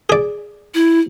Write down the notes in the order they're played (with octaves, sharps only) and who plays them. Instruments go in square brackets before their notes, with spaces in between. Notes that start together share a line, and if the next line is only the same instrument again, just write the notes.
[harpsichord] G#4 D5
[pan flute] E4